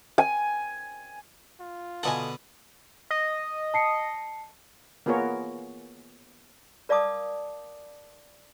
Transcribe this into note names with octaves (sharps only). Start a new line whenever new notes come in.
G#5
F4
B2 D3 A4 D#5 F#5 G#5
D#5
A5 C7 C#7
A#3 B3 F4 G#4 A#4 C#5
A#4 D5 F5 A5 D6 D#6